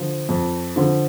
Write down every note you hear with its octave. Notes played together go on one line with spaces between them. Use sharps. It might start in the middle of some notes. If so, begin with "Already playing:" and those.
Already playing: D3 F3
F2
D3 F3